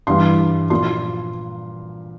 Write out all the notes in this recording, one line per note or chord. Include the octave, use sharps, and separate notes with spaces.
G2 E3 G3 C6
A#2 F3 C6